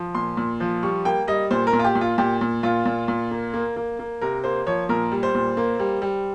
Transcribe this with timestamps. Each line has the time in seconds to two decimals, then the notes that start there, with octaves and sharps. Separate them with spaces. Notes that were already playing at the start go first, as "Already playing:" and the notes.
Already playing: F3
0.15 A#2 C6
0.37 A#2
0.60 F3
0.83 G3 C#6
1.05 A#3 G5
1.27 G3 D#5
1.51 A#2 C5
1.67 A#4
1.73 A#2
1.79 F4
1.84 G4
1.95 A#2
2.01 F4
2.18 A#2 G4
2.41 A#2
2.63 A#2 F4
2.86 A#2
3.08 A#2
3.31 A#3
3.54 A#3
3.76 A#3
3.99 A#3
4.22 C3 A#4
4.44 A#3 C5
4.66 F3 C#5
4.89 A#2 A#4
5.12 G3
5.23 C5
5.35 A#2
5.57 A#3
5.79 G3
6.02 G3